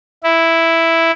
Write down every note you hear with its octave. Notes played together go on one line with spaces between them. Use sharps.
E4